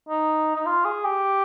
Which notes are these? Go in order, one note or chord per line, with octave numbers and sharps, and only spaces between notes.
D#4
D#4
F4
G#4
G4